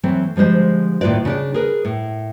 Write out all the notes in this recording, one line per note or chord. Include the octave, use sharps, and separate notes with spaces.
E3 F#3 A3 C4
D3 F3 G3 G#3 C5
D#2 A2 F4 B4 D5
C#3 D4 D5
G#4 A#4 B4
A2